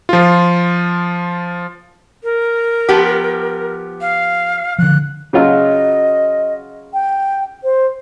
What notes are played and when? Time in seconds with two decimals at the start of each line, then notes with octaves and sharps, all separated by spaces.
0.09 F3 F4
2.23 A#4
2.89 F3 B3 G4
4.01 F5
4.78 D3 F3 F#6
5.33 C#3 F#3 F4 D#5
6.94 G5
7.64 C5